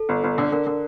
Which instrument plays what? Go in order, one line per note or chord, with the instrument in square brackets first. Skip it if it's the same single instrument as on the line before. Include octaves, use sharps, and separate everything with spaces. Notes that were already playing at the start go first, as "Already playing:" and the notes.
Already playing: [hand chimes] A4
[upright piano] G1
G1
D3
[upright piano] D3 [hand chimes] A#4
[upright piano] D3